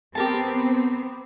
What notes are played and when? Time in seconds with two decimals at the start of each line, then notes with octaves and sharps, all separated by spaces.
0.15 B3 C4 G4 A#4 A5